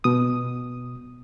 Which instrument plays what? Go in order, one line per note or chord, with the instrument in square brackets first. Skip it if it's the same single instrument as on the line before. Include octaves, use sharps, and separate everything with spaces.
[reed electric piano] B2 D#6